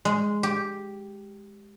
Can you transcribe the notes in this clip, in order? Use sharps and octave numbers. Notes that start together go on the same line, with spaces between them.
G#3
G4